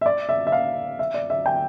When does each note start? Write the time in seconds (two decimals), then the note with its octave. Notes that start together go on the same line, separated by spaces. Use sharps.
0.01 E5
0.06 D5
0.29 E5
0.47 E5
0.52 F5
0.99 E5
1.14 D5
1.30 E5
1.46 G5